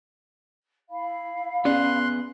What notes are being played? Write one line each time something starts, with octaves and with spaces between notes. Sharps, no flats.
E4 F5 B5
B3 C#4 G#4 D5 C6 F#6